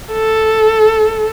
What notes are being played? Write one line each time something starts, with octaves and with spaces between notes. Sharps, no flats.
A4